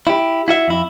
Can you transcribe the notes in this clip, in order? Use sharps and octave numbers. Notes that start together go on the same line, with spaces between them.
E4 G4
E4 F#4 E5
F2 E4